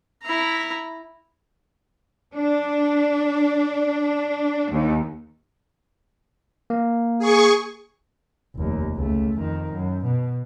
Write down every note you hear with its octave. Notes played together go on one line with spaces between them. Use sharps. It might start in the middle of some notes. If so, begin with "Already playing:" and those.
E4 A#5
D4
D#2
A#3
G#4 C#6
F1 D#2
C#2 A3
F2 D#3
F#2
B2